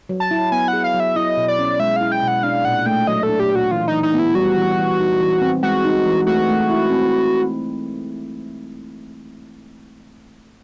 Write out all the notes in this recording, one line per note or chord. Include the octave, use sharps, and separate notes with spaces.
F#3
A5
E4
B3 G#5
F#5
G#4
F5
F#3
E5
E4 D#5
B2
D5
C#4
G#3 E5
E4 F5
G5
B2 F#5
D4 F5
A#2 F#5
A3 G5
F#3 D#5
A4
D4
G4
A#2
F#4
E3 F4
E3 D#4
D#4
B3
E4
G3 F#4
E3
E3
D#4
E3
C4
G#3 F#4
D#4
E3
A3 F#4
A3
E4
C4